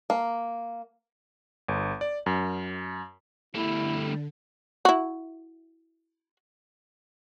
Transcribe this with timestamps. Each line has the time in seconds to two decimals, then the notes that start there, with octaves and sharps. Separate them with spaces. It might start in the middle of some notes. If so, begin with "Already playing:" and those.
0.10 A#3
1.68 G1
2.01 D5
2.26 F#2
3.55 D3 G3 A3 E4
4.85 E4 F#4